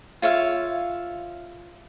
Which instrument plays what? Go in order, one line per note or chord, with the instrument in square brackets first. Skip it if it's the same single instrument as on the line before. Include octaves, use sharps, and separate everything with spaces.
[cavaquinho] F4 C#5 E5 F5